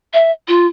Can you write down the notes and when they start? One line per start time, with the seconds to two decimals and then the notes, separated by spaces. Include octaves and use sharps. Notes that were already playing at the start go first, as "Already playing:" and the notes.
0.13 E5
0.48 F4